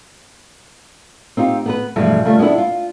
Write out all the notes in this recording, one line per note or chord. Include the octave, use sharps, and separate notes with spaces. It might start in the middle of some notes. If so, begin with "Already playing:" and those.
C4 D#4 F4 G4
B3 A#4 B4
G2 B2 E3 F3 G#3 A3
C#3 F3 G3 A3
G#3 B3 C#4 D4 E4
F4